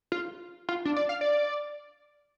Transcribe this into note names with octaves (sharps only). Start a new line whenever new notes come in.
F4
F4
D4
D5
F5
D5